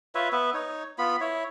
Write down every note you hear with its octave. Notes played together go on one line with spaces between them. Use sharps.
F4 B4 C#5 E5
B3 B4 E5
D#4 C#5
B3 F4 B5
E4 C#5